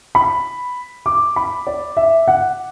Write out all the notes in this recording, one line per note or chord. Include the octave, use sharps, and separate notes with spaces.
B5
D6
B5
D5
E5
F#5